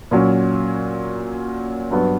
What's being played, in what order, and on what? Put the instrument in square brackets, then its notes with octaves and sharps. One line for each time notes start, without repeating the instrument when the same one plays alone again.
[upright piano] A#2 F#3 C#4
G2 F#3 B3